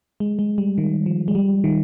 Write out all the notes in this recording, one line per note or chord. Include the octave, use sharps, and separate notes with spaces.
G#3
G#3
G3
D#3
F3
G#3
G3
D#3